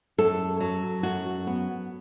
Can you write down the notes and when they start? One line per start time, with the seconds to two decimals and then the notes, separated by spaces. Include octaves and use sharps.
0.18 F#2 A4
0.60 F#3
1.03 F#2 F#4
1.47 B3